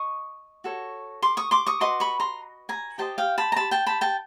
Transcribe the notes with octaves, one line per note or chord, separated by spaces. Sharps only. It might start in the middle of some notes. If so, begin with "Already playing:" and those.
Already playing: D#5 C#6 D#6
F#4 A4 C#5
C6 D6
C#6 D#6
C6 D6
C#6 D#6
F#4 B4 D#5 C6 D6
B5 C#6
A#5 C6
G#5 A#5
G4 C5 D#5 G5 A5
F5 G5
A5 B5
A#5
A5 B5
G5 A5
A5 B5
G5 A5